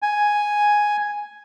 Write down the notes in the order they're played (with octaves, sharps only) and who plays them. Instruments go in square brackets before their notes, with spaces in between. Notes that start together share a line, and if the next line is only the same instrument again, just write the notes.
[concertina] G#5